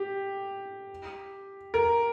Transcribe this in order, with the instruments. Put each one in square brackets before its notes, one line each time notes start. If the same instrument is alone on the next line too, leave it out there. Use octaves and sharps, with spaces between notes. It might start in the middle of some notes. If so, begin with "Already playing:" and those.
Already playing: [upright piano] G4
A#4